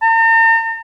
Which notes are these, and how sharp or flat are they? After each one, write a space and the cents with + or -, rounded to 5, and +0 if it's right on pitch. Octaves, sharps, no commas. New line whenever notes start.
A#5 -45